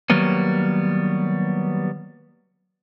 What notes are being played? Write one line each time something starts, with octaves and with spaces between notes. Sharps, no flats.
D#3 F#3 G3 A#3 B3